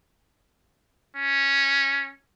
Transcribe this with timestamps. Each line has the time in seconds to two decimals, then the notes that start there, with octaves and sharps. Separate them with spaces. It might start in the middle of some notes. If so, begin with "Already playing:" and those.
1.16 C#4